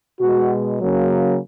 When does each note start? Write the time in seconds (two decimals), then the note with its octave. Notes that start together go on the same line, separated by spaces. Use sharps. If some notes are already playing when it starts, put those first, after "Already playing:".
0.21 B2 G#3 F#4
0.79 C#3 F#3 A#3